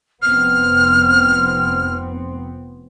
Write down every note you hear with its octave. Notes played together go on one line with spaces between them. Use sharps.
F1 B3 C4 F6